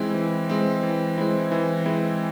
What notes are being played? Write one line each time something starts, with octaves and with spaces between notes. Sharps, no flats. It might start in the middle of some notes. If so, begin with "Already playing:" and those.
Already playing: E3 G#3 C4 E4
E3
G#3 C4 E4
E3
G#3 C4 E4
E3
G#3 C4 E4